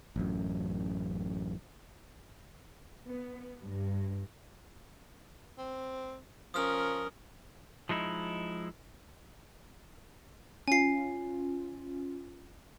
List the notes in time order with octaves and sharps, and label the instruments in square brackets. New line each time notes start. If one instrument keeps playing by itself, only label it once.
[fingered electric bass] A1 F#2
[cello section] B3
G2
[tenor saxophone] C4
[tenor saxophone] F3 [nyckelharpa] C#4 A#4 [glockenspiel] D#6 F6
[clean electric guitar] F3 G#3 D#4 E4
[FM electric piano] C#4 F4 [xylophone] G#5 C7